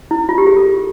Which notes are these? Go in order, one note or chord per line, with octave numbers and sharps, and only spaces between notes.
E4
F4
G4
G#4
A4